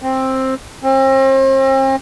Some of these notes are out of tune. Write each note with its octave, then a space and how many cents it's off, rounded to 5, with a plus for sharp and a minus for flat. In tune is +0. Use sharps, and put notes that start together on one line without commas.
C4 +10
C4 +40